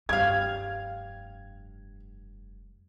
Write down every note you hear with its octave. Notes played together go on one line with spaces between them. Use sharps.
F1 G2 G4 F5 G#6